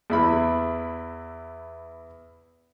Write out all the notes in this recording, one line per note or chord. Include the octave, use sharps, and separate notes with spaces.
E2 E4 B5